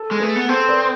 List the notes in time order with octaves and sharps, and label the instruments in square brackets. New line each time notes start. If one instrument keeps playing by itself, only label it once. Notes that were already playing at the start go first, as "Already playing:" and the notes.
Already playing: [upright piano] A4
[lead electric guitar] G#3
[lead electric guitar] A3 [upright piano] G#4 B4
[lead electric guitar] B3
[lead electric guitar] C4 [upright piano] A4 C5
[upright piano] B4 D5